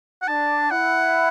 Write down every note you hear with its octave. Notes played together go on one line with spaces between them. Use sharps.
F#5
D4 A5
E4 F#5